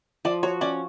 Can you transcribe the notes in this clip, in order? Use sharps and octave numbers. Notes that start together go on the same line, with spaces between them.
F3 D5
F#4 C#5
C#4 D5